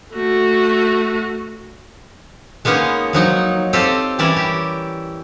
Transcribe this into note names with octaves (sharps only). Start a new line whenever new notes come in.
A3 F#4
G#3 A#3 B3 C#4 D#4
F3 F#3 D#4
C4 F4 G4 A4
E3 G3 C#4 E4 A#4 D5
G4